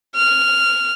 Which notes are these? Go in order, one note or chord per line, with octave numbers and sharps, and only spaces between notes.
F6